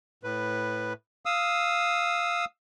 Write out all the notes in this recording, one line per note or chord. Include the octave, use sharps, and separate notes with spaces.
A2 B4
F5 D#6 E6